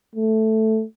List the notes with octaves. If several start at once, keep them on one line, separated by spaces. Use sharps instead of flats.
A3